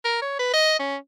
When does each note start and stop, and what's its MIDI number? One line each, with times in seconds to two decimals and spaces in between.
0.05 0.19 70
0.22 0.38 73
0.39 0.50 71
0.54 0.78 75
0.79 0.96 61